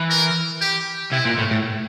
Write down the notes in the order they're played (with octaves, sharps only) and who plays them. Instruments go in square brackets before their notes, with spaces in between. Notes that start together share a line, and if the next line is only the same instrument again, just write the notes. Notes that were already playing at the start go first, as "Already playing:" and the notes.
Already playing: [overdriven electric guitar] E3
[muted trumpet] A#4
G4
[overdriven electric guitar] C3 [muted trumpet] E4
[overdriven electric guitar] A#2
A2
A2